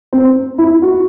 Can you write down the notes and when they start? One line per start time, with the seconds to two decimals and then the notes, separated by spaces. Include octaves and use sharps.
0.13 C4
0.58 E4
0.82 F#4